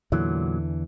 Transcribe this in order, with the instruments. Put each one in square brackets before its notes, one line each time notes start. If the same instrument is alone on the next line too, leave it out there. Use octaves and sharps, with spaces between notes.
[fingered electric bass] E2 D3 E3 [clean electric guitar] A#2 F#3